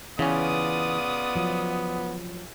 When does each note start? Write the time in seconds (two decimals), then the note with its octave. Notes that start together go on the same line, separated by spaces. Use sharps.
0.19 C#3 E3 B3 C#4 F4 D5 D#6
1.35 F3 F#3